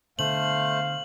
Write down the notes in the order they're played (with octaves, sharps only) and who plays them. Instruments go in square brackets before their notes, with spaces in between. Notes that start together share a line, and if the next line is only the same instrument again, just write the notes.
[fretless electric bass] B2 D3 [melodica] A3 C5 [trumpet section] F5 [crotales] F#7